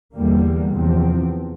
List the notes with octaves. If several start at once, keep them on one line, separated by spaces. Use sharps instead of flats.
E2 D3 G3 A#3
E2 C3 F3 C4